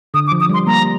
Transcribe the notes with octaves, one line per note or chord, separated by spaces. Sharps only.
D3 D#6
D6
F3
D#6
G3 C6
G3 A#3 A#5